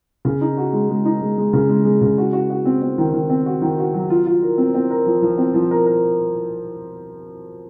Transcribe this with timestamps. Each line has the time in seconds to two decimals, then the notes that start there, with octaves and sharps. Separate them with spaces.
0.25 C#3
0.41 D#4
0.57 F#4
0.73 G#3
0.90 G#3
1.05 D#4
1.21 G#3
1.38 G#3
1.53 C#3
1.69 G#3
1.85 G#3
2.01 C#3
2.18 F#4
2.33 F#4
2.50 F#4
2.65 C4
2.82 C4
2.98 D#3
3.14 D#3
3.30 C4
3.46 F#4
3.62 D#3
3.78 F#4
3.94 F#3
4.10 F4
4.26 F4
4.42 A#4
4.58 C4
4.74 C4
4.90 A#4
5.06 F3
5.22 F3
5.38 C4
5.54 F3
5.71 A#4
5.86 A#4